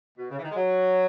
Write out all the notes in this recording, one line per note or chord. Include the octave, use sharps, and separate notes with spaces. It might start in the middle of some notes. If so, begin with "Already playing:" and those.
B2
C#3
E3
D#3
G#3
F#3